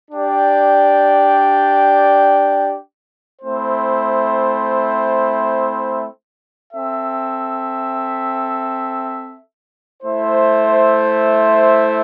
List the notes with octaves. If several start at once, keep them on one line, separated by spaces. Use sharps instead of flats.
D4 G4 D5 G5
A3 C4 E4 C5
C4 A4 E5
A3 E4 C5